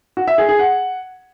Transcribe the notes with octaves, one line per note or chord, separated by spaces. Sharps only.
F#4
E5
G#4
G#4
F#5